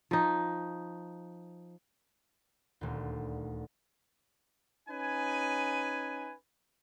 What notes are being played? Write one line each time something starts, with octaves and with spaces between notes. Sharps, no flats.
F3 D#4
D#1 D2
C#4 D#4 B4 G#5